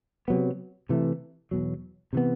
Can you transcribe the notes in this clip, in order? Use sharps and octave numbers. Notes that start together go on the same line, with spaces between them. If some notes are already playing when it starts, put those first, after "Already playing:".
C3 F#3 B3
C3 E3 A3
E2 B2 F#3
C3 E3 B3